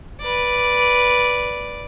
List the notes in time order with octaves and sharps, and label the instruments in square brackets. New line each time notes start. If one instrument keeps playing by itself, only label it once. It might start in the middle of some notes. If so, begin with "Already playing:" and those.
[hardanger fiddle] B4 D5